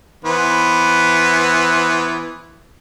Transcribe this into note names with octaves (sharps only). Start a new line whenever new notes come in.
E3 B3 C5